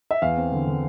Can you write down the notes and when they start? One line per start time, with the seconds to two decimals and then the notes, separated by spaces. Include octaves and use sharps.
0.11 E5
0.22 E2 F5
0.37 C4
0.52 D3
0.67 D3